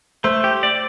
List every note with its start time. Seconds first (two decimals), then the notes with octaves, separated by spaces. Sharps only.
0.24 A3 C5
0.44 G4
0.63 D5